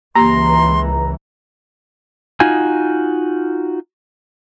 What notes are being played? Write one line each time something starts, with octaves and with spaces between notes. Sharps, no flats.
C#2 E3 A#3 G4 A#5 C6
D#4 F4 F#4 G#5